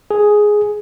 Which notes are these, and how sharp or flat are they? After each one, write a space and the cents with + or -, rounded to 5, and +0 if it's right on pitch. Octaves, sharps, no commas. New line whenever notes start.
G#4 +5